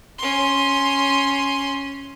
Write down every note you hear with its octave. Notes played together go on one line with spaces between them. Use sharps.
C#4 C6